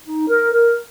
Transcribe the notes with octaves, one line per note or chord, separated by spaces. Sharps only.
D#4
A#4
A#4